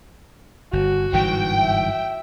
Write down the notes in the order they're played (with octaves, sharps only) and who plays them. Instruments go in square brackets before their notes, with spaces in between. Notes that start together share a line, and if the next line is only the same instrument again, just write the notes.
[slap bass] G1 [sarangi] F#4
[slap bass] G1 G#2 E3 [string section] G5
[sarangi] E5